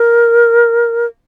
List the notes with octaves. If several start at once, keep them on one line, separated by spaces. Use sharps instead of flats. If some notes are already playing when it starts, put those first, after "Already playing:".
Already playing: A#4